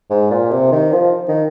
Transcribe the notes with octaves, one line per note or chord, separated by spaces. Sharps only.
G#2
A#2
C3
D#3
F3
D#3